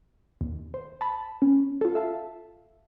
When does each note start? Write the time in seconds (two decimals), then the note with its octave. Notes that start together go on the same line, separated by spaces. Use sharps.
0.41 D#2
0.74 C5
1.01 A5 B5
1.42 C#4
1.81 F4 A4
1.95 E5 F5 A5